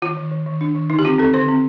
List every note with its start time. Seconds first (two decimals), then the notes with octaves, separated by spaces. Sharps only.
0.02 D#3 F4
0.17 D#3
0.31 D#3
0.46 D#3
0.61 D4
0.75 D#3
0.90 D3 D#4
0.99 G4
1.05 C4 F4
1.19 C4 A4
1.34 D3 C5
1.48 C4